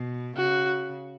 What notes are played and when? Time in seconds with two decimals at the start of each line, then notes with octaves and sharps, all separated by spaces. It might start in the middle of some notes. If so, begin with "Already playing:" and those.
Already playing: B2
0.37 C#3 F#4